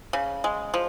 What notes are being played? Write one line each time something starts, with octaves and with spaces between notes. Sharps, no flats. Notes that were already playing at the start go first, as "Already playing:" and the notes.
C#3
G#3
F3